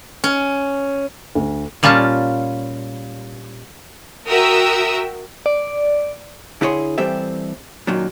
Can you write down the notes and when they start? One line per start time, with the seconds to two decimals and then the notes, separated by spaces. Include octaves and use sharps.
0.24 C#4
1.35 D2
1.83 A#2 G3 C#4 F4 A5
4.28 F#4 A#4 E5 G5 D#6 E6
5.46 D5
6.61 D3 E4 F#4 G#4 C#5 C6
6.98 E3 G3 C4 G4 A4 E5
7.87 F#2 A#2 D#3 F#3